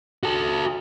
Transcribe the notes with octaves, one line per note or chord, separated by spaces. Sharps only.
F#4 A4